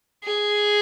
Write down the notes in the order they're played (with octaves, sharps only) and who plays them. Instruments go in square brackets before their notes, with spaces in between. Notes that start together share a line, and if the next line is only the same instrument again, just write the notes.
[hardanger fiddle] G#4